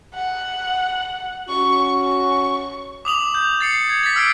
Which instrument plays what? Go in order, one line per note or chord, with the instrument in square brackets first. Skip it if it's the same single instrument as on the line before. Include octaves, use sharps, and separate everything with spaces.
[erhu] F#5
[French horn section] C#4 F#4 [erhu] C#6
[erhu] C#6
[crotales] D6 D#6 F7 F#7
G6
A6 C7 C#7
G#6
A6 B6
E6 F6 C7 D7